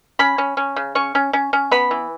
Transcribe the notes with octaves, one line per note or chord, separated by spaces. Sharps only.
C#4 B5
C#4
C#4
C#3
C#4 C#6
C#4
C#4
C#4
B3 B5
E3